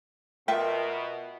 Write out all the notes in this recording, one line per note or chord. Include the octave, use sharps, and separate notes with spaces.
B2 F4 A#4 E5 G5